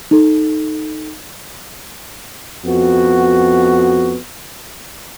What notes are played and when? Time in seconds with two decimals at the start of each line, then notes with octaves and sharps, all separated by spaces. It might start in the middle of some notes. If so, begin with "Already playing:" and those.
0.11 D#4 A4
2.65 F2 B3 F#4